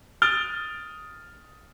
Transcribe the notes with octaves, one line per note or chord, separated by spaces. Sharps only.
D#6 F6 A6 D7 G7